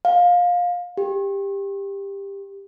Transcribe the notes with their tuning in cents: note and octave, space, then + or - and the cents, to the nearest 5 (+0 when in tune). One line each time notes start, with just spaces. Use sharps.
F5 +20
G4 +15